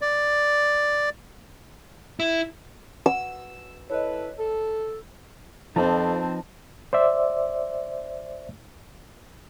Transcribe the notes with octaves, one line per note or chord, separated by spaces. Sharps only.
D5
E4
F#5 E6
E4 A4 B4 C#5 D#5
A4
F2 F3 C4 D#4 B4 A5
C5 D5 E5